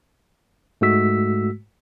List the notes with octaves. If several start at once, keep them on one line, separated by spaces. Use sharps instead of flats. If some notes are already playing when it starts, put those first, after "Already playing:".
G#2 G#3 A3 F#4 E6 B6